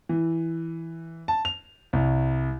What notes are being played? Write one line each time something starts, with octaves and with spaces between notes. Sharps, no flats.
E3
A5
F7
C2